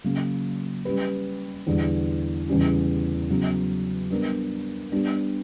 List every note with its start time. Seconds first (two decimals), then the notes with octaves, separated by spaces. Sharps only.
0.04 C#3 F#3 A#3
0.85 G3 C#4 G4 B4
1.67 E2 D3 G3
2.48 E2 C#3 G3 C#4
3.29 C#3 F#3 B3
4.11 G3 B3 D4 A#4
4.92 G3 B3 D4 G4